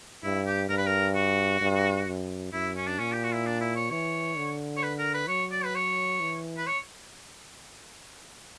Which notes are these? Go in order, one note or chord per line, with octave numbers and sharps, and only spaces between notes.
G2 E4
G4
G2 A#4
B4
A#4
F#4
G2
F#2
F#2 E4
C#4
D4
A#2 C#4
G4
F#4
E4
D4
E4
C#5
E3 C#5
D3
C#5
B4
A#4
B4
F#3 C#5
D5
B4
C#5
E3
B4
C#5